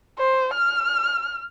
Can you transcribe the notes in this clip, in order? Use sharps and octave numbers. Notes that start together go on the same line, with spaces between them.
C5
F6